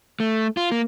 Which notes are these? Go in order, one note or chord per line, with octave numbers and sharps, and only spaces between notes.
A3
F4
A#3